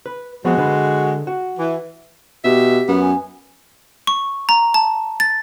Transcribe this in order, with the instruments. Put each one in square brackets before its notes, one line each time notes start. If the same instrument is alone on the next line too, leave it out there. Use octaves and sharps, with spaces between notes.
[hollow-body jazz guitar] B4
[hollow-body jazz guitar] F3 B3 C4 [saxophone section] G#3 F#4
[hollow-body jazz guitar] D3 B4
F#4
[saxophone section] E3
[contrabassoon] B2 [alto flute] G4 [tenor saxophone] E5
[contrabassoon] F#2 [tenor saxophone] B3
[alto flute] G#5
[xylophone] C#6
A#5
A5
A6